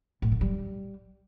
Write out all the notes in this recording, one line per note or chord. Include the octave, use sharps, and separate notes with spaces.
A2
D3
G3